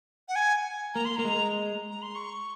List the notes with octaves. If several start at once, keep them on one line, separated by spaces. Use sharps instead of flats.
F#5
G#5
A#3 A#5
C6
A#3 A#5
G#3
A#5
C6
C#6